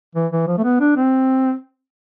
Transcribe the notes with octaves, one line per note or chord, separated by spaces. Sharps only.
E3
E3
F3
A3
B3
D4
C4